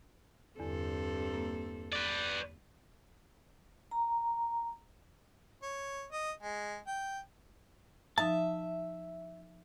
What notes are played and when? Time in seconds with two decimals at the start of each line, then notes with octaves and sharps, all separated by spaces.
0.59 E2 G2 D3 C4 A4
1.33 A#3
1.92 B4 D5
3.91 A#5
5.63 C#5
6.12 D#5
6.43 G#3
6.87 G5
8.18 F3 D#4 E5 A5